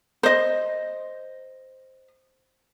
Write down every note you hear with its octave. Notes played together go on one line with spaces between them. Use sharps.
C5 D#5